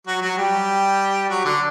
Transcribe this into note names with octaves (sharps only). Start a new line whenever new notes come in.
F#3 F#4
F#3 F#4
G3 G4
F#3 F#4
D3 D4